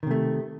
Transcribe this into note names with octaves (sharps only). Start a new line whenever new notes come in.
C3 D#3 A3